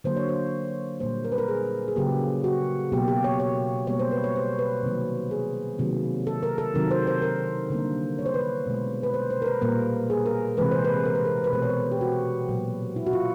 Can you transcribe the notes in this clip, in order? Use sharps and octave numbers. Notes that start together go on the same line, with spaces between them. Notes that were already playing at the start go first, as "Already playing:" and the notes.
D3 F#3 A#3 C5
C#5
C5
A#2 G3 A#3 C5
A#4
B4
A#4
G#4
G#4
C#3 F#3 A#3 G4
F#4
B2 F#3 A#3 G4
G4
C#5
C#5
B2 G3 A#3 C#5
C5
B4
C#5
C5
B4
C3 D#3 F#3 A#3
G#4
C3 D#3 F#3 A#3
A4
A#4
A4
C3 D#3 F#3 A#4
C5
C5
A#4
D3 G3 A#3
C#5
C5
B4
C5
B2 G#3
B4
C5
C5
A#4
B4
A#2 G3 A#3 A#4
G#4
A#4
C3 E3 G#3 B4
C5
B4
A#4
B4
A#4
B4
B2 G#3 C5
C#5
C5
G4
F#4
A#2 F#3 A#3
E4
F#4
F4